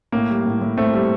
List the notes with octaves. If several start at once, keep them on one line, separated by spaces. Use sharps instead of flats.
A2 A#3
G3
A2
A2
A2 A3 C4
G3